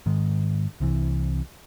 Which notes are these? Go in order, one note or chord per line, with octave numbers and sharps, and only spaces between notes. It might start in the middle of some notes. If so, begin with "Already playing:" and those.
G#2 D#3 G#3
C2 C3 E3